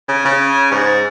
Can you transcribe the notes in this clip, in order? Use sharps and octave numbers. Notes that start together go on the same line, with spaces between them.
C#3
C#3
G#2